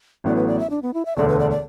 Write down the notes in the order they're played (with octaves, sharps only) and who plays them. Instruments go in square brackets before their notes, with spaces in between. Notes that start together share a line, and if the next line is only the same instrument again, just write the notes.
[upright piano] A1 A2 F#3 B3 [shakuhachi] D5
[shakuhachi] B4
D5
E5
D4
B3
E4
E5
[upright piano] E1 D2 D3 [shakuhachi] D5
[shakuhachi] B4
D5
D5